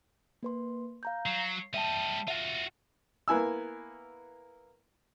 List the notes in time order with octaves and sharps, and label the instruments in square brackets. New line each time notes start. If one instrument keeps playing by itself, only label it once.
[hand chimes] A#3 B4 C6
F5 A#5 G6
[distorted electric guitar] F#3 [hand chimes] C7
[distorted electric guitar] G3 D#5 [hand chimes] E5 G5 A5
[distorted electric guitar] F4 F#4 [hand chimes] E5 F#5
[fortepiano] A#3 B3 E4 G#5 E6